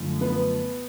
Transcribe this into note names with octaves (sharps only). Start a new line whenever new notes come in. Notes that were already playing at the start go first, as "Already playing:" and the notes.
Already playing: F#2 D3 F3 A3
B3 B4